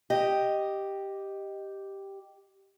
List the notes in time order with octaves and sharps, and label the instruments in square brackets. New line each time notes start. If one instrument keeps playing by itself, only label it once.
[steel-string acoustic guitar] G4 D#5